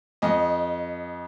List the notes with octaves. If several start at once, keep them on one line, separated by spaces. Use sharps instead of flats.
F2 D#5